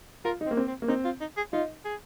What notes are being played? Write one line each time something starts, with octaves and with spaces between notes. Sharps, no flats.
F4 A#4
D#4
C4
A#3
C4
C4
A#3
C4 D#4
F4
D#4
G#4
D#4 F4
G#4